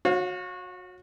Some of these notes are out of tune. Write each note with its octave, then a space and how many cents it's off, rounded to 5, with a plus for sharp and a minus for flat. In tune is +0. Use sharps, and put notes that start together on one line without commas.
F#4 -25 C#5 -20 F5 +30